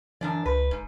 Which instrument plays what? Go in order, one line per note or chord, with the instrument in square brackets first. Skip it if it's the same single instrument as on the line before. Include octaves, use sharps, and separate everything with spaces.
[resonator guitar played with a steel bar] F#2 D4 D5 [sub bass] E3
[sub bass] C#2 [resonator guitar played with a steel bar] B4
[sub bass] F1 [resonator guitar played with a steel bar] G#2